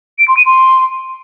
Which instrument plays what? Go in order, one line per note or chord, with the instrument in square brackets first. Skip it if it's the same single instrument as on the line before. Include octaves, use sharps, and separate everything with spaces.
[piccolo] D7
C6
D#7
C6